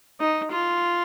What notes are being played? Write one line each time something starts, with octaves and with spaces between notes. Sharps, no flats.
D#4
F4